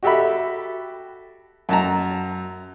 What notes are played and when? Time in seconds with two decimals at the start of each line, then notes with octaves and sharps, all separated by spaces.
0.03 F#4 G4 A4 E5 B5
1.69 F#2 A5 A#5